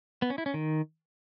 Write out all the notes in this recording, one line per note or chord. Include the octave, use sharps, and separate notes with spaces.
B3
C#4
E4
C#4
D#3